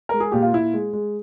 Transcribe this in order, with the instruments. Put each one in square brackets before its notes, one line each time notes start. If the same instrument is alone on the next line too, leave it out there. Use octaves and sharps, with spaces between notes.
[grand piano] G#3 A#4
G#4
A#2 G4
F4
A#2 E4
G#3
G#3